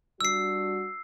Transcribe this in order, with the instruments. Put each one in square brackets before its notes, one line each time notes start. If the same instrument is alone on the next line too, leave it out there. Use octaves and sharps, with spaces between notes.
[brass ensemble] G3 D4 F#4 [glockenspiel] E6 C7